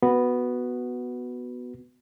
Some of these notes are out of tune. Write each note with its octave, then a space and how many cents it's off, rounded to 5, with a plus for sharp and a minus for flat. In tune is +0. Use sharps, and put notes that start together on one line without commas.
B3 +0 F#4 +0